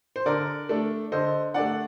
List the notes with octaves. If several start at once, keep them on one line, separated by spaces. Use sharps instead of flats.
C5
D3 A#4 D5
A3 D4
D3 C5 D#5
A3 D4 D5 F#5